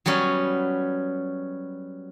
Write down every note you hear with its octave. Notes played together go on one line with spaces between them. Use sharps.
F#3 G3 B3 C#4